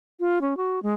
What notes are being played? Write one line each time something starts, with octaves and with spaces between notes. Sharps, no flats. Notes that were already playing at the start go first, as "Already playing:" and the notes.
F4
C#4
F#4
G#3